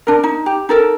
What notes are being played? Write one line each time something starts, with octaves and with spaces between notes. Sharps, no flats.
D4 A#4
D#4
G4
D#4 A4 A#4